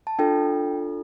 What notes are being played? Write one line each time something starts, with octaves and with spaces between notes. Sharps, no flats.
A5
D4 F4 A4 G5